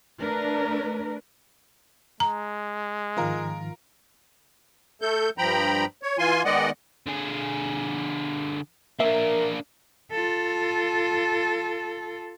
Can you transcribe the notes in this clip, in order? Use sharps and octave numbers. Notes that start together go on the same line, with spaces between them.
A3 D4 A#4 B4
G#3 A#5
G#2 D#3 F3 F4 A#4
A3 A4 G6
G2 F3 G5 A#5 B5
C#5
E3 F4 G#5 C6
D#3 G#3 B3 D5 D#5 F#5
D3 G#4
A#3 D4 A#4 E5
F4 A4